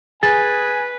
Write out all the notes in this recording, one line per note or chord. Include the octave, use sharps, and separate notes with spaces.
G#4 B4 G#5 A6